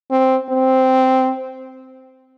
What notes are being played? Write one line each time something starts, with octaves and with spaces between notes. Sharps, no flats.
C4
C4